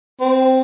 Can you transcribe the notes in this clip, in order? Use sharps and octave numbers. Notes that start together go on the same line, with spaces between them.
C4